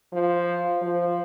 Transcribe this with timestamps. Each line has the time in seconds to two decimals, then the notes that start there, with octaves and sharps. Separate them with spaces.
0.13 F3
0.82 F3